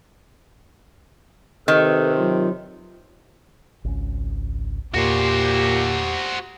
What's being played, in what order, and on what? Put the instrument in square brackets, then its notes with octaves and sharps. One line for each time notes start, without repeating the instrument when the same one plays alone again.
[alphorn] C3 [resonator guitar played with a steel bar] D#3 [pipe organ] A4 B4
[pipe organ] F#3 F4
[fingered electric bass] G#1 C#2 C#4
[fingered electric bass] E2 [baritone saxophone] A#2 [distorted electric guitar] F#4 C5 [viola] G4